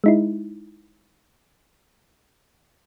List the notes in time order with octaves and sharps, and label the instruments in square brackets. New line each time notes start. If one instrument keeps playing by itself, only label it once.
[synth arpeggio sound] G#3 D#4 E4